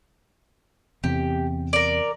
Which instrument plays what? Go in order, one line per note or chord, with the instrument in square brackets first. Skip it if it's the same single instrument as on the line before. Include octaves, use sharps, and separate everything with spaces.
[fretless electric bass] E2 C3 [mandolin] G4
[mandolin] A#4 D5